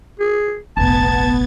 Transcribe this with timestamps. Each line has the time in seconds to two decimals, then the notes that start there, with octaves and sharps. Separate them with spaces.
0.20 G#4
0.77 F1 A#1 B3 A5 G#6 A6